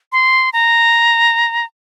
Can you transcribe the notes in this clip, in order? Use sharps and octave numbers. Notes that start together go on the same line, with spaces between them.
C6
A#5